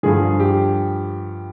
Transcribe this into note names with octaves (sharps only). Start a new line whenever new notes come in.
G2 D3 F3 G#4
G4